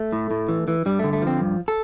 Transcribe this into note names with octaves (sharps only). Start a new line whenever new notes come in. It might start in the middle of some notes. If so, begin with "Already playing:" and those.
Already playing: A3
A2
A2
E3
E3
G2 G3
D3 A3
A3
F3 C4
G2
A4